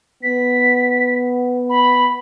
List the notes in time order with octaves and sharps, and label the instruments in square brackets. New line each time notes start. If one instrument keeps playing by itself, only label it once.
[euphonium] B3 [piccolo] B6
[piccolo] B5